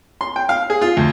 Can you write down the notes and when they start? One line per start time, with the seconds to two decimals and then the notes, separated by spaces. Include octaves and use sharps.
0.21 C6
0.36 G5
0.49 F5
0.70 G#4
0.81 F4
0.97 D2